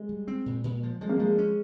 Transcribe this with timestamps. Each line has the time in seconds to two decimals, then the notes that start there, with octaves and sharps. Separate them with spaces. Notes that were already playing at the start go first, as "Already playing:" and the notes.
Already playing: G#3
0.09 G3
0.28 C4
0.46 A#2
0.64 A#2
0.83 F3
1.01 F3 G#3
1.09 A#3
1.17 F3 G#3
1.38 C#4